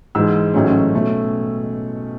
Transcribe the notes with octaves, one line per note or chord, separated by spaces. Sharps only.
G#2 E3 G#3 E6
A1 G#2 F#3 A3 C#4
B2 A3 C#4